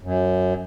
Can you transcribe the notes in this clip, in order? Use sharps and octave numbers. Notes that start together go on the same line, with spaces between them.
F#2